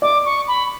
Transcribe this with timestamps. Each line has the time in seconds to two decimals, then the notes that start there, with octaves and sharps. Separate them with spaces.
0.02 D5 D6
0.25 C#6
0.48 B5